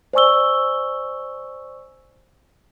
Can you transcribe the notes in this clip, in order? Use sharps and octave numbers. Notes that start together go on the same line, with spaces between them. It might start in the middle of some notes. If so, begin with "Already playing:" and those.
C5 D5 G#5 C#6 E6 G7